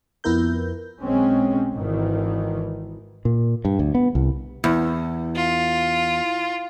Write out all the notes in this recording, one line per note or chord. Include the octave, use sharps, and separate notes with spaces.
F2 B3 E4 A#4 G6
B1 G#3 C4 C#4
G#1 D#3 E3
A#2
G2
D2
B3
C2
E2
F4